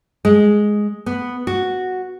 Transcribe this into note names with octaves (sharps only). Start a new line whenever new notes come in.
G#3
B3
F#4